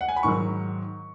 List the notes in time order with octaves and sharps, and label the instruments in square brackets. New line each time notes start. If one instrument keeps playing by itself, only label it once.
[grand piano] F#5
G#5
B5
G#2 D#3 F#3 C#6